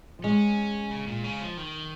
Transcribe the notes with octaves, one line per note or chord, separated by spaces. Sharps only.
F3
G#3 C#4
C#3
A#2
C#3
F3
D#3